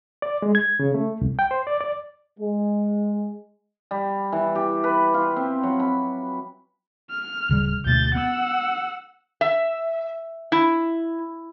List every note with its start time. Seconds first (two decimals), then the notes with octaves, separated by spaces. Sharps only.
0.22 D5
0.42 G#3
0.55 G#6
0.80 C#3
0.94 A3
1.21 C2
1.39 G5
1.51 C5
1.67 D5
1.81 D5
2.39 G#3
3.91 G3
4.32 E3
4.55 G4
4.84 B4
5.14 F4
5.36 C4
5.63 F#3
5.80 B5
7.11 F6
7.49 D1 C#3 G3
7.85 D2 B2 A3 G6 A6
8.15 B3 F#5 E6
9.41 E5
10.52 E4